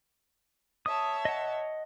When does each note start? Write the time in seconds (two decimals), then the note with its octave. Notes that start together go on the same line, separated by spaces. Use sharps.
0.86 C#5 E5 A5 D#6
1.25 D#5 F#5